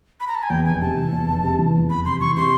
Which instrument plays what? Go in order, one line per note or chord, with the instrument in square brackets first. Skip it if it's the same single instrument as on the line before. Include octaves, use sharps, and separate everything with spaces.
[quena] B5
A#5
A5
G#5
[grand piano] E2 [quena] G5
[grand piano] F1 [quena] G#5
[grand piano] C3 [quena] A5
[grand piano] E3
E2
F1
C3
E3
E2
[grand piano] F1 [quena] B5
[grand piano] C3 [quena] C6
[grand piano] E3 [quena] C#6
[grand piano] C3 [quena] C6